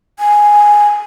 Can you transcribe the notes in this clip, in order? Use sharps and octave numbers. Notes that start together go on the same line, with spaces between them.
G#5